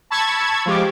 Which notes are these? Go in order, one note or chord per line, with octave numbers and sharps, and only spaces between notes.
A5 B5 C#6 E6 G#6
F3 G#3 G4 D6